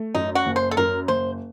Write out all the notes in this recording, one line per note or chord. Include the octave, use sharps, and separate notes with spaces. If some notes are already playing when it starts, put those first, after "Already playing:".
Already playing: A3
F#2 D#4
F#4
F#1
C5
A4
F#2 A#4
F#1 C5